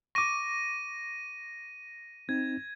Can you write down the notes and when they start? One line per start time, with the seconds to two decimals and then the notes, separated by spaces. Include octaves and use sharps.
0.15 C#6 D6 A#6 D#7
2.29 C4 D#4 G#6